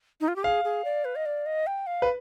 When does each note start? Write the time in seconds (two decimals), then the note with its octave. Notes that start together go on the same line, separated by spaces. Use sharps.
0.21 D#4
0.28 F4
0.36 G4
0.43 G#4 F5
0.64 G#4
0.85 D5
1.05 B4
1.16 D#5
1.26 D5
1.46 D#5
1.67 G5
1.87 F5
2.02 B4